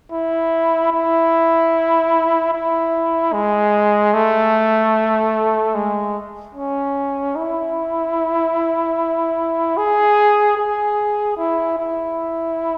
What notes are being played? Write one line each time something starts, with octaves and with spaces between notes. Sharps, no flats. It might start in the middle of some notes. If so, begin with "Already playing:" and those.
E4
E4
E4
G#3
A3
G#3
C#4
E4
G#4
G#4
E4
E4